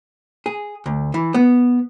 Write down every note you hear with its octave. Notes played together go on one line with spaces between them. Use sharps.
G#4
D2
E3
B3